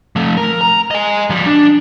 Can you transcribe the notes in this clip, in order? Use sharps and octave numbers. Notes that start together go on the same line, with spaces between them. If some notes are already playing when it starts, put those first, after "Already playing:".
F3 A3
A#4
A#5
D#5 G#5
F3 G3
D4